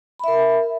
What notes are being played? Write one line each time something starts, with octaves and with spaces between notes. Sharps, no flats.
A#4 E5 B5